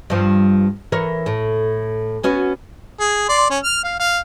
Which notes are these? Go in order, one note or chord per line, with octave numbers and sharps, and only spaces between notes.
G2 F3
E3 A#4 C#5
A2
B3 C#4 F#4
G#4
D5 C6
C#4
F6
F5
F5